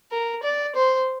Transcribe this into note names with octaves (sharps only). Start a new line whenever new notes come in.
A#4
D5
C5